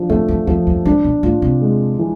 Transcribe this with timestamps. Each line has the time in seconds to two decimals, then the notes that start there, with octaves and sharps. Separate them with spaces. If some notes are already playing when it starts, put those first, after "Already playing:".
Already playing: F3 D4
0.10 F2 A3
0.28 F2
0.47 F2 F3
0.67 F2
0.85 G#2 D4
1.04 B2
1.23 A2 F4
1.42 C3
1.61 G#3
1.99 E3